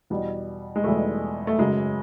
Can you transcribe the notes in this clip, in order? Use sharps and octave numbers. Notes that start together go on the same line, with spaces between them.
E2 B2 G3
G#3
E2 B2 G3 A3
A3
F#2 C#3 F#3 G#3